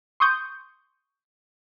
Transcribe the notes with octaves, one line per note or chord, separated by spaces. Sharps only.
C6 C#6 D#6 G6